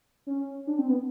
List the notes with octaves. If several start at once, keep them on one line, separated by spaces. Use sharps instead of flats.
C#4
D4
C4
B3